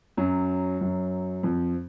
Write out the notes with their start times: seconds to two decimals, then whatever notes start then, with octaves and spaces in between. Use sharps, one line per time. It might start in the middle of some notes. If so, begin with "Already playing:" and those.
0.17 F#2 F#3
0.81 F#2 F#3
1.43 F2 F3